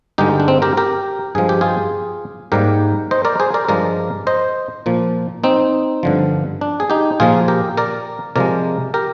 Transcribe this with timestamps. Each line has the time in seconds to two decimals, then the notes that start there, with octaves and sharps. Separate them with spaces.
0.18 G2 D3 G#3 D#4 G4
0.40 D4
0.48 C4
0.62 G4 A#4
0.77 G4 A#4
1.35 G2 F3 G#3 G#4
1.49 G4
1.61 F4 G#4
2.52 G#2 G3 A#3 G4 A#4
3.11 C5 D#5
3.25 A#4 D5
3.40 G#4 C5
3.54 A#4 D5
3.69 G2 F3 G#3 A#4 D5
4.27 C5 D#5
4.86 A#2 F3 A#3
5.44 C4 D#4
6.03 G2 D3 F3
6.61 D4
6.80 G#4
6.90 D#4 G4
7.20 A#2 F3 A#3 F4 G#4
7.48 G4 A#4
7.77 A#4 D5
8.36 C3 F3 G#3 A#4 D5
8.94 G4 A#4